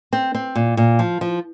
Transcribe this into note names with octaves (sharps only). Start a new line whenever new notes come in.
C4
C4
A#2
A#2
F3
F3